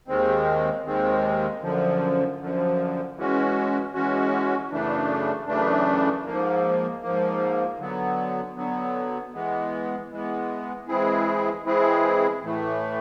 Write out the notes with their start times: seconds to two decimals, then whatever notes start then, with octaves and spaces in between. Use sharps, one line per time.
0.08 D#2 D#3 G#3 C4
0.85 D#2 D#3 G#3 C4
1.62 F#2 D3 F3
2.40 F#2 D3 F3
3.17 E3 G#3 C#4 F#4
3.94 E3 G#3 C#4 F#4
4.70 F#2 C#3 E3 A3 D4
5.47 F#2 C#3 E3 A3 D4
6.25 G#2 F3 A#3
7.02 G#2 F3 A#3
7.79 D3 F#3 B3
8.56 D3 F#3 B3
9.34 E3 G#3 B3
10.11 E3 G#3 B3
10.88 E3 G#3 C4 E4 G#4
11.64 E3 G#3 C4 E4 G#4
12.42 A2 E3 A3